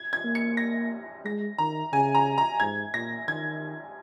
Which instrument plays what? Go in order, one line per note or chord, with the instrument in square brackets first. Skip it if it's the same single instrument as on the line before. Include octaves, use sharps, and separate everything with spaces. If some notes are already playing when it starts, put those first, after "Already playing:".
Already playing: [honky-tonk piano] G#6
G#6
[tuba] A#3
[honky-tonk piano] C#7
A#6
[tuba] G#3 [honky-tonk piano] A#6
[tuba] D#3 [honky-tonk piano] A#5
[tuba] C#3 [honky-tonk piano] G#5
[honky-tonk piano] A#5
A#5
[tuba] G#2 [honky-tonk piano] G#6
[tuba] A#2 [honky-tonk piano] A#6
[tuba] D#3 [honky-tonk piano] G#6